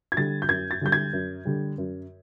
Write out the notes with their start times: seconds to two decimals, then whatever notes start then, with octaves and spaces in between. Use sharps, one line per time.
0.12 G#6
0.16 D3 G3 A6
0.42 G6
0.49 F#2 G#6
0.71 A6
0.81 D3 G3 G6
0.92 G#6
1.13 F#2
1.45 D3 G3
1.78 F#2